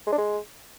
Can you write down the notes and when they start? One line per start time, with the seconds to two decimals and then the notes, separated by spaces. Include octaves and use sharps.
0.07 G#3
0.12 D4
0.18 G#3